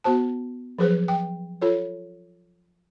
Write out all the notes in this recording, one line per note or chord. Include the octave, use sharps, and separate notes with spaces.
B3 F#4 C5 A5
F3 F#3 G#4 B4 C5
G5
F4 A4 C#5